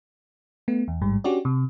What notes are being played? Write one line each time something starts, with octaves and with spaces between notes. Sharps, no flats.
A3 B3
E2
A1 G#2 G3
C#4 D4 F#4 G4 D5
C3